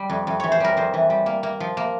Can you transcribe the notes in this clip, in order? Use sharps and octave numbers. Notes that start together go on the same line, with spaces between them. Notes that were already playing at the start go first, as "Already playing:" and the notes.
Already playing: G3
F2
F2
E3 C#5
C5
G3 A#4
F2 C5
E3
G3
A#3
A#3
F3
A#3